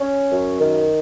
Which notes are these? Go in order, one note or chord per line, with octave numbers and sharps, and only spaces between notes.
C#4
F#2
D#3